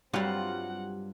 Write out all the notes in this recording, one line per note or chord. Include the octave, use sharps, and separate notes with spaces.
G2 F#3 G3 C4 F4 F#5